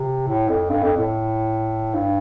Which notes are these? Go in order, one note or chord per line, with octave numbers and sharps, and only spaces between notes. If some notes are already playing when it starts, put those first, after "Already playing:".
Already playing: C3
A2
F2
G2
F2
A2
G2